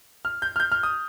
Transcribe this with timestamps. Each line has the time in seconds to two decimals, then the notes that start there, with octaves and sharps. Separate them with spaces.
0.25 F6
0.42 G6
0.56 F6
0.60 G6
0.72 F6
0.83 D#6